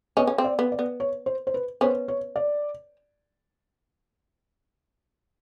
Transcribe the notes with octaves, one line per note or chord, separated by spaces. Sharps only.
B3 C#4 D#5
C#4
C4
D5
B3
D5
B3
C#5
C5
C5
B4
B3 C#4 C5
C#5
D5